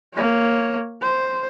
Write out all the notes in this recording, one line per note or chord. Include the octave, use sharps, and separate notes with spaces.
A#3 C#5
C5